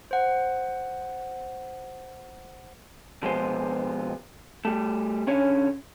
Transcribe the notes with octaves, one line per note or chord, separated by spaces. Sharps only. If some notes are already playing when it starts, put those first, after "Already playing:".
C5 F#5
B2 F3 G#3 B3 C5
G3 A3
D3 C#4 C#5